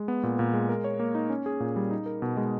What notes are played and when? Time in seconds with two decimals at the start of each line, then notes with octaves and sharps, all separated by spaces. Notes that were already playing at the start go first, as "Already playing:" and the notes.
Already playing: G#3
0.08 B3
0.23 A#2
0.39 A#2
0.54 G#3
0.69 A#4
0.84 C#5
0.99 A#3
1.15 D#4
1.30 C#4
1.46 G#4
1.60 A#2
1.76 G3
1.91 D#4
2.06 A#4
2.22 B2
2.37 G#3